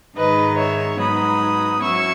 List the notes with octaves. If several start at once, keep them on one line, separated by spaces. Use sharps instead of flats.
G#2 D#3 G#3 D#4 B4 D#5
C#5 E5
G#2 F#3 B3 D#4 B5 D#6
F#3 C#4 E4 C#6 E6